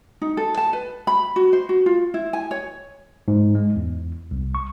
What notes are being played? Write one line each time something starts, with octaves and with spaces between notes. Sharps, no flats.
D#4
A4
A5
B4
B5
F#4
C5
F#4
F4
E4
G#5
C#5
G#2
G#3
E2
C2
C#6